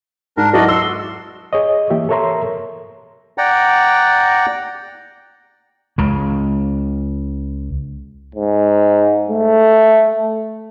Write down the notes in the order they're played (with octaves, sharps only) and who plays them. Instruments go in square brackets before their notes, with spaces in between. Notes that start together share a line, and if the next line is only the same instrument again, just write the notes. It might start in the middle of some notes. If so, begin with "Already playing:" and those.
[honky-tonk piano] G#2 [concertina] D4 A#4
[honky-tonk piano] F#3 E4 A4 [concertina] F#4 D5 D#5
[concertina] C6 [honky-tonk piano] E6 C#7
[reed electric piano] G#4 C#5 D#5
E3 A#3 G4 E5
A4 A#4 C#5 E5 A#5 C6
[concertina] D5 F#5 G5 A#5
[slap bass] C#2 C#3
[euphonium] G#2
A3